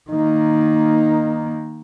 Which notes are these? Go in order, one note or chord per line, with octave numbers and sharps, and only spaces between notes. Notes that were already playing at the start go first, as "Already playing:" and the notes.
D#3 A#3 D#4